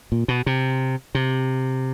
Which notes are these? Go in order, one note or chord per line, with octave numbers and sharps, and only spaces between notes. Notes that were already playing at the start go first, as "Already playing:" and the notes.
A#2
B2
C3
C3